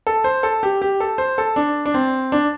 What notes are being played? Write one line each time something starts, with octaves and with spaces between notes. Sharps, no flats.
A4
C5
A4
G4
G4
A4
C5
A4
D4
D4
C4
D4